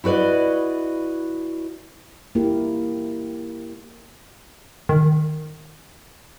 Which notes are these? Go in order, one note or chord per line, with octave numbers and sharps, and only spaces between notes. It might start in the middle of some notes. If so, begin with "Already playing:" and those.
E4 F#4 B4 D5 D#5
A#3 E4 G4 A#4
D#3